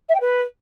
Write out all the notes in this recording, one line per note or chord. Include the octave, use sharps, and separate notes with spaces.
E5
G5
B4